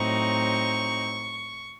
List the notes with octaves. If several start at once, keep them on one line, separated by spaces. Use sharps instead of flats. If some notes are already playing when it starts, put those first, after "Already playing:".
Already playing: A2 F#3 C4 D#4 C#6